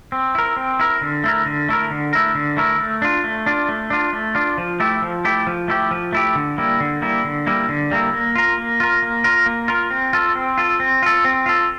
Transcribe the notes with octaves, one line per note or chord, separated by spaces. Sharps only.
C4
E4 A#4
C4
E4 A#4
D3
A3 E4 A#4
D3
A3 E4 A#4
D3
A3 E4 A#4
D3
A3 E4 A#4
A3
D4 F4
A3
D4 F4
A3
D4 F4
A3
D4 F4
F3
A3 E4 G4
F3
A3 E4 G4
F3
A3 E4 G4
F3
A3 E4 G4
D3
G3 A#3 E4
D3
G3 A#3 E4
D3
G3 A#3 E4
D3
G3 A#3 E4
A#3
F4 A#4
A#3
F4 A#4
A#3
F4 A#4
A#3
F4 A#4
C4
F4 A4
C4
F4 A4
C4
F4 A4
C4
F4 A4